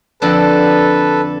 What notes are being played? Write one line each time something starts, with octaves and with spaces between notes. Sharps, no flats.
F2 D3 D4 A4 B4